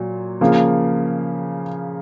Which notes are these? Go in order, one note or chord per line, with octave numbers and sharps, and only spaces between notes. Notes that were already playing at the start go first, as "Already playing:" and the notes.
Already playing: A#2 F#3
C#3 F3 A#3